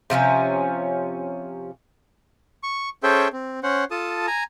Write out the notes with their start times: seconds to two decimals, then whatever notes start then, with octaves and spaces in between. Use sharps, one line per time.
0.10 C3 F3 C4 C#4
2.63 C#6
3.03 C#4 G#4 A4 C5 E5 G5
3.33 C4
3.63 C#4 C5 F#5
3.91 F4 A4 A5 D#6
4.27 G#5 A#5